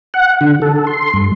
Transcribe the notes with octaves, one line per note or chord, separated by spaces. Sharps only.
F#5
D3
A4
C6
G2